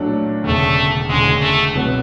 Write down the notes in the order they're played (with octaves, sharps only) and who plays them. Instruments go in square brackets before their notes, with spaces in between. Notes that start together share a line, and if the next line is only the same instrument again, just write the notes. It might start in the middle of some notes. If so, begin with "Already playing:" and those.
Already playing: [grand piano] A#2 F#3 A3 D4
[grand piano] E1 D2 C#3 [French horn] A3
[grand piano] E1 D2 C#3 [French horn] G#3
[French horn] A3
[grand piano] C2 B2 F#3 B3